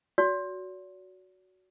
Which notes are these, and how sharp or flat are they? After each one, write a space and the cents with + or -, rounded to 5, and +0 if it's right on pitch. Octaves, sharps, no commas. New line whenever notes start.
F#4 +0 D5 -45